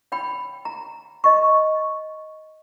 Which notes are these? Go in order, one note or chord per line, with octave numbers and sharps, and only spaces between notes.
C#5 G5 B5
A#5
D#5 C#6